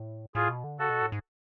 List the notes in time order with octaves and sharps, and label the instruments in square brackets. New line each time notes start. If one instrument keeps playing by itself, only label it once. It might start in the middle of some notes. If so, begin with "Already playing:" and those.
Already playing: [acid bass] A2
[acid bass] A2 [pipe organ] F4 G#4
[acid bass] B2
D3
[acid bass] C#3 [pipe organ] F#4 A4
[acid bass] B2
A2
G#2